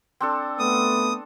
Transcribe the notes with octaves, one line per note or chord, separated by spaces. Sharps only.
C4 D4 A4
A3 B3 D#6